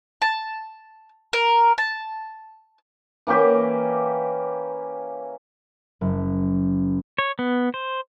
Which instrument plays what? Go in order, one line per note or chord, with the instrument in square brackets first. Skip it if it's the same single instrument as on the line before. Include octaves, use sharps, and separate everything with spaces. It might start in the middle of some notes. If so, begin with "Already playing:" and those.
[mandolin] A5
A#4
A5
[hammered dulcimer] E3 A#3 C#4 G4
[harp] F#1
[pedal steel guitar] C#5
B3
C5